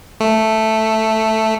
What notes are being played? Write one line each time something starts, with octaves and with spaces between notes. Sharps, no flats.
A3